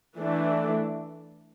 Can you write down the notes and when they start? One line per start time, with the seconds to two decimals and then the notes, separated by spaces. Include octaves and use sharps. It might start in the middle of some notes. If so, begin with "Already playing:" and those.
0.17 E3 A3 D4